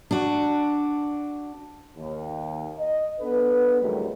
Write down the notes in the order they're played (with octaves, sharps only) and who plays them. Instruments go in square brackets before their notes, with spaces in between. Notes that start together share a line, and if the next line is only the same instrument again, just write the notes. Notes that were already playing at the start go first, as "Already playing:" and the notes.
[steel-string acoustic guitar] D4 F#4
[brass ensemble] D#2
D#5
B3 D4 A4 B4
D#2 A#2 C#3 F#3 G3 A3